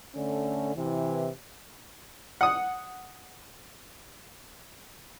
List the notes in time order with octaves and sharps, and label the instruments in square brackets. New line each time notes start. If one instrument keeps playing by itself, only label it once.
[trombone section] D3 A3 C#4
C3 E3
[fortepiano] F#5 D#6